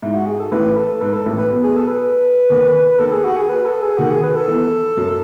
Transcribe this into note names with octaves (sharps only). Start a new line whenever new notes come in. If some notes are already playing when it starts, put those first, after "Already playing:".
G#2 E4
F#4
G#4
A4
A1 A2 B4
A4
G#2 B4
A4
A1 A2
B4
B1 B2
G#4
A4
B4
D#2 D#3
D#2 D#3 A4
G#4
F#4
G#4
B4
A4
G#4
D#2 D#3 F#4
G#4
B4
A4
E2 E3
F#2 F#3